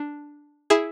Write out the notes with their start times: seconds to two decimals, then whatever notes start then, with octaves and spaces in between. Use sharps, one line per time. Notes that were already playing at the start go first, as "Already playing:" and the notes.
Already playing: D4
0.70 E4 G#4